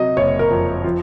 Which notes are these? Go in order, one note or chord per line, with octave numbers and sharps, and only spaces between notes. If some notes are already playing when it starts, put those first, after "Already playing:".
Already playing: C3 F#3 D#5
F#1 C#5
A#4
F2
F3